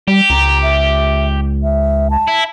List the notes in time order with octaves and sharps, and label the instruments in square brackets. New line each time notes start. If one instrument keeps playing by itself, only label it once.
[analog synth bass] G3 [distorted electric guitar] G4
[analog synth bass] C#2 [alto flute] A#5
[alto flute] E5
E5
A5
[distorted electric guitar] E4